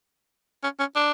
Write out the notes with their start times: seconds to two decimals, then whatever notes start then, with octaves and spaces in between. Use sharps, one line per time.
0.63 C#4
0.79 C#4
0.96 D4